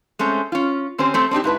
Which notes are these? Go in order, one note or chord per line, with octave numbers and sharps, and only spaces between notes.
G#3 A3 C4 C#4
C#4 F4
D3 C4 C#4 G4 C5
A3 C4 A4
C4 D4 D#4 G4
G#2 E4 B4 A5